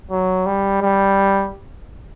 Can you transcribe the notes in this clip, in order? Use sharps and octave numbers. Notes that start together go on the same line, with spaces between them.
F#3
G3
G3